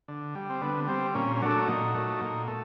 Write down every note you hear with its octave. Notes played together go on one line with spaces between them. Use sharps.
D3
G3
C4
D3 B3
G3 C4
A#2 C#4
C#4
F#3 A3 D4
A#2 D#4
F#3 A3
A#2
A3